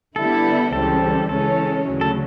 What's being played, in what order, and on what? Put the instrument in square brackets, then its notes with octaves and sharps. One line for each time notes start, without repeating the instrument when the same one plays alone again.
[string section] D3 G3 B3 E4 [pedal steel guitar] A4
[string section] C#2 C#3 E3 G3 C4 [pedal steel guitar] A4
[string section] C#3 E3 G#3 C#4 [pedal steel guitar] A4
[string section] D2 C#3 F#3
[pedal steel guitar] A4